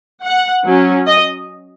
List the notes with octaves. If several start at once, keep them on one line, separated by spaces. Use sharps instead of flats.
F#5
F#3 C#4
D#5